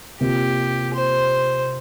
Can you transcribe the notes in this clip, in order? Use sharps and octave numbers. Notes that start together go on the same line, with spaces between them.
C3 A#3 F4 G4
C5